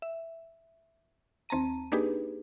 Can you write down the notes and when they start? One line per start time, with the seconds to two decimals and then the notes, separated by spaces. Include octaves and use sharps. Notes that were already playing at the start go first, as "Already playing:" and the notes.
0.02 E5
1.49 D#2 C4 A5 A#5 D#7
1.92 A#3 D4 D#4 G4 G#4 B4